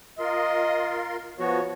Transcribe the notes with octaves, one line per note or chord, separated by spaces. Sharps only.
F4 A#4 D#5 C6
F3 B3 F#4 C#5